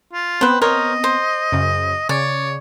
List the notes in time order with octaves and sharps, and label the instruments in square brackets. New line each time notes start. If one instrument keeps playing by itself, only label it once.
[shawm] F4
[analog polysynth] B3 C4 [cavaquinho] B4 C5
[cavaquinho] A#4 C5 C#5 [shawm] D#5
[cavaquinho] C5
[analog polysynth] F#2 C#3
[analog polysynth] C#3 [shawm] C#5 [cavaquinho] D5